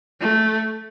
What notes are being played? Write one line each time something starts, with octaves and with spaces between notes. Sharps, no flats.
A3